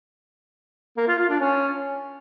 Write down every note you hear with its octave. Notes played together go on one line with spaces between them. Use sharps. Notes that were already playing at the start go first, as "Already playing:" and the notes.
A#3
F4
F4
D4
C#4